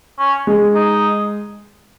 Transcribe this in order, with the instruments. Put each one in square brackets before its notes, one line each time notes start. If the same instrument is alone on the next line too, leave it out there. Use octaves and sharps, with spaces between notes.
[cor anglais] C#4
[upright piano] G#3
[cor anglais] D#4